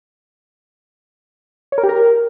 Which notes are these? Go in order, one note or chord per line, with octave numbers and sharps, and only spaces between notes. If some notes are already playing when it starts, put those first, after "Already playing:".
C#5
A#4
G4
A#4